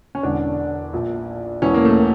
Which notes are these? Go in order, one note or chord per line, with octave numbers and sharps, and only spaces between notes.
C#4
E1 E2 D3 D4
A#1 A#2
E1 E2 E3 C#4
A#3
A3